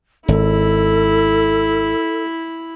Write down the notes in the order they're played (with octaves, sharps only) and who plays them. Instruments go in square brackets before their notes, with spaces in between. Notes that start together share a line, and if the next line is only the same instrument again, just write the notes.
[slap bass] G#1 [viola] E4 [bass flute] A4